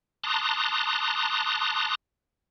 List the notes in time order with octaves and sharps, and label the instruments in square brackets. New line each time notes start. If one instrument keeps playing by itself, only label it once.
[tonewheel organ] A5 A#5 C6 D6 D#6 F#6